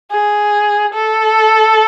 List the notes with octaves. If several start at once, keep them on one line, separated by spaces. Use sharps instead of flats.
G#4
A4